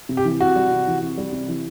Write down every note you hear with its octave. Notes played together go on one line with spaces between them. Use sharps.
C3
G4
E3
C3 F#4
G3
C3
E3
C3
G3
C3
E3